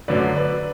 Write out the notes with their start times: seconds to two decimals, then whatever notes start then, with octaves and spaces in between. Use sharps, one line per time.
0.08 F#2 D3 F#3 A3 B4 D5
0.36 B4 D5